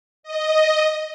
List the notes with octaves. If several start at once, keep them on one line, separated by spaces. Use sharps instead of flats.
D#5